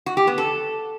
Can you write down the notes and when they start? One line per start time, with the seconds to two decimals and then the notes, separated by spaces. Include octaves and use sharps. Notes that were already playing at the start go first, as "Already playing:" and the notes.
0.06 F#4
0.17 G4
0.27 B3
0.38 A4